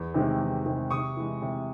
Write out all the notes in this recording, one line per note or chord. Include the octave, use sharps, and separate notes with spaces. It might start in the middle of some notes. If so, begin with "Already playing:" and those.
Already playing: E2
C3 D#3 G#3 C4
E2
C3 D#3 G#3 C4
C3 C#6 D#6
E3 G#3
C3